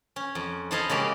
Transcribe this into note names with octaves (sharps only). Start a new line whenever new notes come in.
C#4
F2
E4 A4 C5 D#5 F5
C#3 G#3 A#3 C#4 G4